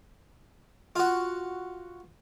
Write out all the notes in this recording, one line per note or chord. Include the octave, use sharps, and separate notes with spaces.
F4 F#4